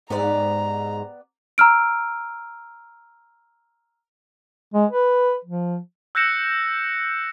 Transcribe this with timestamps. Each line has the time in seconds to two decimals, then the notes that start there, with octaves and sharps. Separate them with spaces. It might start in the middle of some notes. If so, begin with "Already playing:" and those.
0.10 G#2 B3 G4 D5 A#5
1.58 A#5 E6 F6 D7
4.74 G#3
4.91 B4
5.44 F3
6.15 E6 F#6 G6 A#6 C#7 E7